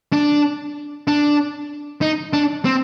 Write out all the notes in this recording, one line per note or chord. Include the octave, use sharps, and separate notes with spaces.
D4
D4
D#4
D4
C4